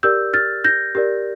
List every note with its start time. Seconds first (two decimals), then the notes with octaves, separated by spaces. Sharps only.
0.03 G4 A#4 D5 E6 G6
0.33 F6 A6
0.64 G6 A#6
0.95 G4 A#4 D5